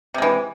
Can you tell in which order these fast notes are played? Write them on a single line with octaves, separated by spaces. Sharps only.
C3 G#3 E3